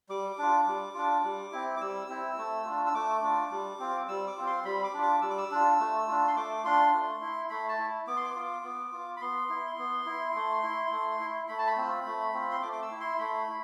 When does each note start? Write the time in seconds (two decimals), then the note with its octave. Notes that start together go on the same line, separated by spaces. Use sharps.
0.09 G3 D6
0.38 D4 F4
0.67 G3
0.95 D4 F4
1.24 G3
1.52 C4 E4
1.77 D6
1.81 G3 E6
2.09 C4 E4
2.38 A3
2.66 D4 F4
2.86 E6
2.94 A3 D6
3.22 D4 F4
3.51 G3
3.80 C4 F4
4.08 G3 E6
4.27 D6
4.37 C4 F4
4.47 C6
4.65 G3 B5
4.84 D6
4.94 D4 F4
5.03 D6
5.22 G3 E6
5.30 D6
5.38 E6
5.51 D4 F4
5.80 A3
6.08 D4 F4
6.28 C6
6.36 A3 D6
6.64 D4 F4 C6
6.93 A3
7.21 E4
7.50 A3 B5
7.69 A5
7.79 E4
8.07 B3 D6
8.17 C6
8.25 D6
8.36 F4
8.64 B3
8.92 F4
9.17 B5
9.21 B3 C6
9.49 E4
9.78 B3
10.06 E4
10.35 A3
10.63 E4
10.92 A3
11.20 E4
11.49 A3 B5
11.59 A5
11.67 B5
11.77 C4 F4
12.06 A3
12.34 C4 F4
12.51 C6
12.62 A3 D6
12.72 D6
12.82 E6
12.91 E4
13.01 C6
13.19 A3 B5
13.48 E4